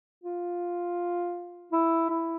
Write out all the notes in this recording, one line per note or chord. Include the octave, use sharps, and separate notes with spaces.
F4
E4
E4